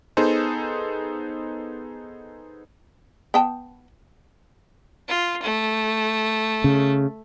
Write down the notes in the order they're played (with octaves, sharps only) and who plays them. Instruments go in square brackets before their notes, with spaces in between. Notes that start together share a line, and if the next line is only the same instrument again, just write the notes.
[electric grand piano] B3 D#4 G#4 A4 C5
[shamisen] B3 G5 A5
[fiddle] F4
A3
[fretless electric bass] C#3